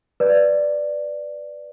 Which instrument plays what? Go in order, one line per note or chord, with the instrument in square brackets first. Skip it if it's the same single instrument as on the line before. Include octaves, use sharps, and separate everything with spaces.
[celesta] B4 D5